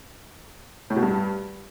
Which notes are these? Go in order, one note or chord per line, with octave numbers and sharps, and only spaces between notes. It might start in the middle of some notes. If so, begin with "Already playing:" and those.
A2
B2
G2